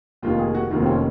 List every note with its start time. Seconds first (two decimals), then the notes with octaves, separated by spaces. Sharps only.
0.23 F1 D#2 D#3 F4
0.39 G#4
0.55 F#4
0.71 F1 D#2 D#3 F4
0.82 C4
0.86 C#4